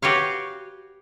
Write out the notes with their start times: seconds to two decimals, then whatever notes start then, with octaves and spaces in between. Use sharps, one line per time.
0.02 F#4 G4 B4 C#5 F5